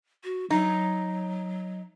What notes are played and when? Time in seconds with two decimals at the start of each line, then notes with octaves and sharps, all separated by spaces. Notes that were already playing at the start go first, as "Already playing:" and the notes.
0.24 F#4
0.50 F#3 D#4